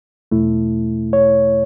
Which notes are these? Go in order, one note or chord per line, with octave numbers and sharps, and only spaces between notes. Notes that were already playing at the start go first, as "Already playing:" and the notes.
E2 B2 A3 E4
C#5